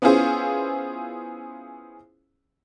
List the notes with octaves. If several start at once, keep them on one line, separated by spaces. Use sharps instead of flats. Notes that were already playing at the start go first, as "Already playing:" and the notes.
B3 C#4 E4 F4 G#4 C5